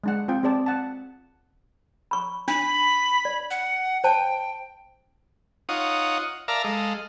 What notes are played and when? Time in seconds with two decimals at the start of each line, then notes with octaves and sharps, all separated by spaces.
0.04 G#3 D4 F#5
0.28 C4 F4 G5
0.43 C4 G#4 D5 A5
0.66 F#5 A5
2.11 B5 C#6
2.48 D4 B5
3.25 D5
3.50 F#5
4.04 C5 G5 A5
5.69 D#4 F4 C#5 F#5 D#6
6.48 A#4 D5 E5 F5 A5 A#5
6.64 G#3 A4 D#5 F5